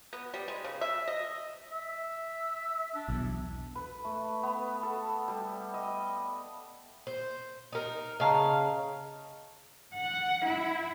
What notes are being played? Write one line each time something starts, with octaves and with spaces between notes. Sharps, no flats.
B3
G3
G#3
C#3
E5
D#5
E5
D4
B1 E2
B4
A3
B3
A4
G3
D#5
C5
D#4 A#4
C#3 D#5 F5 A5 A#5
F#5
E4